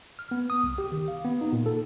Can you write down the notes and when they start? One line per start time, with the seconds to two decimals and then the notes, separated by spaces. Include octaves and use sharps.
0.19 F6
0.31 B3
0.50 D#6
0.63 C2
0.78 G4
0.92 D#3
1.08 F5
1.25 B3
1.41 D#4
1.53 A#2
1.66 A4